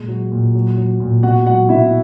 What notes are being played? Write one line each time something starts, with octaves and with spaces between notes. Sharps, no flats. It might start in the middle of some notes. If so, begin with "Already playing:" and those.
Already playing: A#2 G#3
F#3
A#2
F#3
F#3
A#2
B2 F#4 F#5
F#3 F#4 F#5
B2 E4 E5